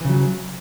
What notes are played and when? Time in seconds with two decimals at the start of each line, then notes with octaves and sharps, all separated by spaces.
0.01 E3
0.05 C#3
0.09 F#3